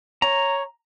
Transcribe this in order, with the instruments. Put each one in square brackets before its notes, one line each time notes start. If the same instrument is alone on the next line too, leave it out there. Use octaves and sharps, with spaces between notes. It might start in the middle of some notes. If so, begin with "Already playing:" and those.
[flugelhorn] C#5 [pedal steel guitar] A#5